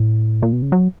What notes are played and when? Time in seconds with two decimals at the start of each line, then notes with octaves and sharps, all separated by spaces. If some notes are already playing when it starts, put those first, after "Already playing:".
Already playing: A2
0.42 A#2
0.53 B2
0.62 C#3
0.72 F#3